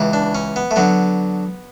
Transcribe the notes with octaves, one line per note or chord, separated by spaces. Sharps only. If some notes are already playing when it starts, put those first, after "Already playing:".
Already playing: C#2 C#3 E3
D4
C#4
B3
A3
D3 F#3 B3